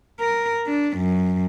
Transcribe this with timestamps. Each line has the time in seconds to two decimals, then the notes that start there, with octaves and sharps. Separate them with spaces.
0.20 A#4
0.67 D4
0.98 F#2